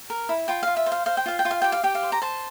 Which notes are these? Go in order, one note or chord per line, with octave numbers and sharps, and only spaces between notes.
A#4
E4
F4 G5
F4 F5
E5
C5
F5
C5 F5
G5
F4 F5
G5
F4
F5
G4 G5
F5
G4 G5
F5
C5
A#5
C5 A5